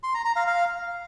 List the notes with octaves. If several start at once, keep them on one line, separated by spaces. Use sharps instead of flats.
C6
A#5
A#5
F5
F5